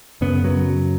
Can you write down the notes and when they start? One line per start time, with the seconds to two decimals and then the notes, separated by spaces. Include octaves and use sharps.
0.21 F#2 C#3 B3
0.44 F#3